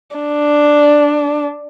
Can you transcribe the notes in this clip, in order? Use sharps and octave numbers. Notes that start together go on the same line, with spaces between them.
D4